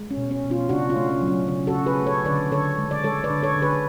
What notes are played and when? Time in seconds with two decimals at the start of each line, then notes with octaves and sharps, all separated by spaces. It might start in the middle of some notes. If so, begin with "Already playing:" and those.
Already playing: G#3
0.11 C#4
0.17 B2
0.31 C#4
0.44 B2
0.50 C#4 F4
0.69 C#3 D4 F#4
0.90 C#4 F4
0.96 A3
1.09 C#4
1.22 F#3
1.28 C#4
1.48 C#3 C#4
1.67 F#4 A4
1.74 C#3
1.86 G#4 B4
2.00 A3
2.07 A4 C#5
2.25 D3 B4 D5
2.52 D3 A4 C#5
2.78 G#3
2.91 D5
3.04 G#3 A4 C#5
3.24 B4 D5
3.30 D3
3.43 A4 C#5
3.56 D3
3.62 G#4 B4